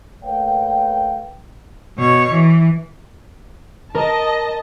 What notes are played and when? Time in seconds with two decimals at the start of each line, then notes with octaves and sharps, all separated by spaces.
0.24 A3 A#3 B4 C#5 F5 G5
1.98 B2 C#5
2.31 E3
3.95 A#4 D#5 A5